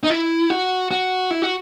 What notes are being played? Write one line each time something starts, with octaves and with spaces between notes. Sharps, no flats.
D#4
E4
F#4
F#4
E4
F#4